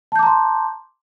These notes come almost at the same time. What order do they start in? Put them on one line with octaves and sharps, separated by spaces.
A5 G6 D6 A#5 C6